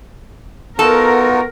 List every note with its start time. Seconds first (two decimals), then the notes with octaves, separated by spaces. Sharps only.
0.79 B3 D#4 F4 F#4 A4 A#4